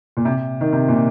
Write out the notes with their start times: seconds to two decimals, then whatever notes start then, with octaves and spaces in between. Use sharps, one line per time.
0.17 A#2
0.25 C3
0.61 D#3
0.73 C3
0.88 A#2